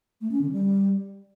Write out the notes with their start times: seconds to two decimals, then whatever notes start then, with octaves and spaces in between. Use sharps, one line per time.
0.21 A3
0.31 C#4
0.42 D3
0.52 G3